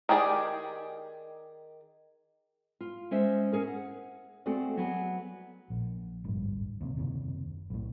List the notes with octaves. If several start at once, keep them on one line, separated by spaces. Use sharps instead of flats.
D#3 G4 G#4 D5
F4
G#3 C#4 C5 E5
C#4 G#4 A#4
F#5
A3 C4 F#4 G#4 A4 D5
F#3 B3 G#4
A#1
D1 G#1 G2
D#2 C3
F#1 D#2 C3
B1 A2